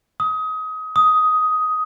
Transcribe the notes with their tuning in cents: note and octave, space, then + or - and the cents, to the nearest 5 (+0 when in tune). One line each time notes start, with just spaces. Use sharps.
D#6 +25
D#6 +10